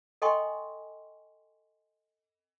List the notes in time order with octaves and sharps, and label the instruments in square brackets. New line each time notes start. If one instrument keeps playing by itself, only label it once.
[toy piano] A4 D#5 G5 G#5 C6 C#6